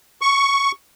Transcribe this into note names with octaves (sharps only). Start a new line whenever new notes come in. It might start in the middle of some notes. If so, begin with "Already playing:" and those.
C#6